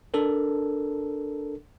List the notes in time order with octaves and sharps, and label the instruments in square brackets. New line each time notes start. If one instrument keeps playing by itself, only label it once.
[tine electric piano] D4 A4 A#4